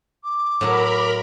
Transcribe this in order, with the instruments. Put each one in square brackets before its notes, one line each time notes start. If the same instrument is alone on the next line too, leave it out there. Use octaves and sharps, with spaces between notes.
[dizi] D6
[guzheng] A2 F#3 [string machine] A#4 A#5 B5